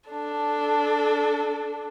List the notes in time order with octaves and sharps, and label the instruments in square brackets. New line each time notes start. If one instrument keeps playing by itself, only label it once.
[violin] D4 A4